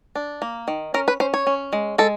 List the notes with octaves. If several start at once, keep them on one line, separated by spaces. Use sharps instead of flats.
D4
A#3
D#3
C#4 A#4
B4
C#4 C5
C#5
C#4
G#3
G#3 A4